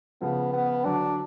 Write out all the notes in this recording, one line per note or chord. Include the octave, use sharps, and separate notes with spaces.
C#3 F3 B3
B3
D3 F#3 D4